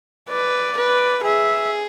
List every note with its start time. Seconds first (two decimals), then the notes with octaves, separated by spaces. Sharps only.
0.29 B4 D5
0.77 B4
1.24 G#4 E5